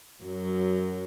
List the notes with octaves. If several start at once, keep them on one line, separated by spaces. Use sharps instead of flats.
F#2 F#3